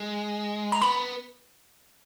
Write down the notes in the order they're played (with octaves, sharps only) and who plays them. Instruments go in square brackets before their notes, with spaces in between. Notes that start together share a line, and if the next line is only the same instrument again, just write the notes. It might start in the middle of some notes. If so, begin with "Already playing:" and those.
Already playing: [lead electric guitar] G#3
[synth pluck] A#5
[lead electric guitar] B3 [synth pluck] B5